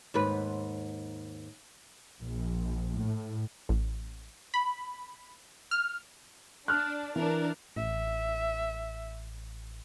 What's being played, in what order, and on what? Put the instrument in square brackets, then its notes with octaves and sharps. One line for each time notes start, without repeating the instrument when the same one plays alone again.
[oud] D#2 G#2 B4
[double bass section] A#1
A2
[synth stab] A1
B5
F6
[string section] D4 [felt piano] F6 F#6
[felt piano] E3 [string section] D4 A#4
[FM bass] A1 [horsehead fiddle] E5